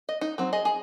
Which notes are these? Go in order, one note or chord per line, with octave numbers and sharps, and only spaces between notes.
D#5
D#4
F#3 C4
G#4 D#5
G#4